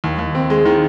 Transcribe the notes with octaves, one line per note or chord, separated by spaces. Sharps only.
D#2
D#2
C4
G#3
D#3